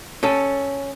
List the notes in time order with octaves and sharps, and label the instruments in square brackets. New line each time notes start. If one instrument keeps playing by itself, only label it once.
[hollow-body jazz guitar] C#4 A4